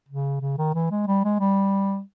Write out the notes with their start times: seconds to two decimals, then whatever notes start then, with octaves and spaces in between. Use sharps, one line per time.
0.09 C#3
0.41 C#3
0.58 D#3
0.75 E3
0.91 G#3
1.08 G3
1.25 G#3
1.40 G3